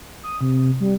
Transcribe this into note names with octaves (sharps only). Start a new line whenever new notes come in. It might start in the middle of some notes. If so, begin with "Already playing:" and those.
D#6
C3
G3